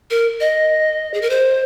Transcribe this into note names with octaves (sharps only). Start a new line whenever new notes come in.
A#4
D#5
G#4
A#4
C5